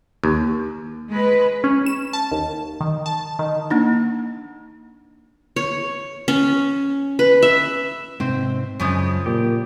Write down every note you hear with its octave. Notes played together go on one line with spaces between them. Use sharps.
D#2
G#3 B4
C#4
E7
A5
D#2
D#3
A5
D#3
A#3 D4 D#4
C#5
C#4
B4
E5
G#2 C3 C4 C5
F#2 C#3 F3 G#3
A#2 G4